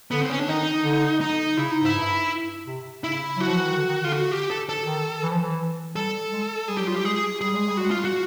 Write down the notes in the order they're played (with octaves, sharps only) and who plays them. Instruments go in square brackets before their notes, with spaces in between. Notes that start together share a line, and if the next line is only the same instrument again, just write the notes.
[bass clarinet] D3 [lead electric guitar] B3
[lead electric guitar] C4
C#4
D4
[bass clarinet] D#3 [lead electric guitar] D#4
[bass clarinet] D3
[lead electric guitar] D#4
[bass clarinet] C#3 [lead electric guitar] E4
[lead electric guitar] D#4
[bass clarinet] G#2 [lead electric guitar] E4
[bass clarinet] G2
C3
[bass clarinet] C#3 [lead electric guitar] E4
[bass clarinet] F#3 [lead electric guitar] F#4
[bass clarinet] F3
E3
D#3
D3
D#3
[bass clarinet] D3 [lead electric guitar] F4
[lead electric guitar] F#4
G4
A4
A4
[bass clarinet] D#3
E3
F3
E3
[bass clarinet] G3 [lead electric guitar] A4
[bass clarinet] G#3
[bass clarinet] G3 [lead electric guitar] G#4
[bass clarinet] F#3 [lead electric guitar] G4
[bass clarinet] G3 [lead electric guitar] F4
[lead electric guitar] G4
[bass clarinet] G#3 [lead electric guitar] G#4
[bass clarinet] G3 [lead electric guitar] G#4
[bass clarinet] G#3
G3
[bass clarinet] G#3 [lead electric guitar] F#4
[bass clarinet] G3 [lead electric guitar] F4
[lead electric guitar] F#4